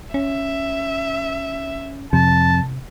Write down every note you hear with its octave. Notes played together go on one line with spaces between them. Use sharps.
C#4 E5
F2 C3 A5